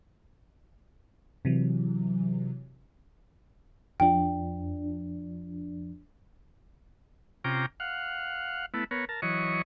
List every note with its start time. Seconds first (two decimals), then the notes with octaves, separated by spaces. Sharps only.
1.45 C3 E3 F#3
4.00 F2 F3 D4 G5
7.44 C3 C#4 F4 G5 A#5 D6
7.80 F5 F#5
8.74 A3 B3 E4
8.91 B3 A#4 C#5
9.09 A#4 A5
9.22 E3 F#3 C#5 D#5 C#6